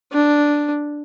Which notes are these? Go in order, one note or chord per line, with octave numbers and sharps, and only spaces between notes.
D4